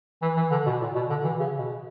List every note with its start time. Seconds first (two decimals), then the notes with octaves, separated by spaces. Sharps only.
0.22 E3
0.37 E3
0.51 D3
0.66 B2
0.81 A#2
0.95 B2
1.10 D3
1.24 E3
1.40 C#3
1.58 B2